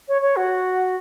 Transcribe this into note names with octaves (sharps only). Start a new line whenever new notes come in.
C#5
C#5
F#4